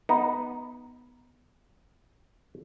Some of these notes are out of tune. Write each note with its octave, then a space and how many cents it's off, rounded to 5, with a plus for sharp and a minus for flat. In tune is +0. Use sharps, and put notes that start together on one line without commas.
B3 +0 D#4 +0